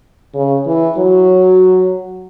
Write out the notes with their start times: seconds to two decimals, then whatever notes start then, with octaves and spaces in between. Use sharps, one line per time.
0.34 C#3
0.66 E3
0.97 F#3